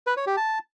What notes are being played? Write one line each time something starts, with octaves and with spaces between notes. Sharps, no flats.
B4
C#5
G4
A5